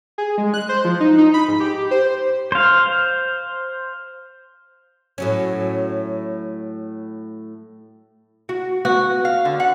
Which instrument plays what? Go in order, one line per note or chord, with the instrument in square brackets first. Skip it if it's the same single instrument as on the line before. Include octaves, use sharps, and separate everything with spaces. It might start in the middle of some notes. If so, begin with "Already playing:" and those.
[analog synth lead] G#4
G#3
F#6
C5
F3
D#4
D#4
B5
G#2
G4
C5
[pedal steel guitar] C5 F5
[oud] A2 F#3 C#4
F#4
[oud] B3 [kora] F#4
[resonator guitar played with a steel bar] F5
D3
F#5